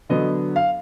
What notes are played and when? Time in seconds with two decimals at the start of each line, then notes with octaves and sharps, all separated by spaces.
0.09 D3 F#3 B3 D#5
0.56 F5